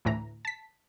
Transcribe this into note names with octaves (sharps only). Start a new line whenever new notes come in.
D2 A2 E3 A#5
A5 B6